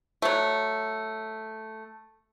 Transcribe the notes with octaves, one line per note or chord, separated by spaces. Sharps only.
F#3 A3